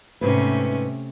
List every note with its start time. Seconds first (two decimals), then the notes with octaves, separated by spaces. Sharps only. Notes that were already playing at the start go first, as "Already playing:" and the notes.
0.21 G#2 C3 A3 C#4 B4